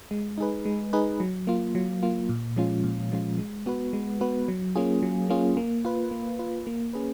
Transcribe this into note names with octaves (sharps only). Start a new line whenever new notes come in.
G#3
D#4 G#4 B4
G#3
D#4 G#4 B4
F#3
A#3 F4
F#3
A#3 F4
A#2
F3 G#3 C#4 F4
A#2
F3 G#3 C#4 F4
G#3
B3 F#4 B4
G#3
B3 F#4 B4
F#3
A#3 C#4 F4 G#4
F#3
A#3 C#4 F4 G#4
A#3
F4 B4
A#3
F4 B4
A#3
C#4 G#4 B4